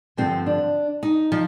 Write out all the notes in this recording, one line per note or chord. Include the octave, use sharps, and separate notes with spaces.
G2 D3 F3 C4
D4
D#4
F3